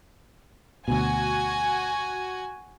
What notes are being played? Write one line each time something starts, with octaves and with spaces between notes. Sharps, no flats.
D2 B2 F#4 G#5